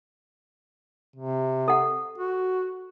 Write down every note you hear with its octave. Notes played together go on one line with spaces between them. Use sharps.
C3
A4 F#5
F#4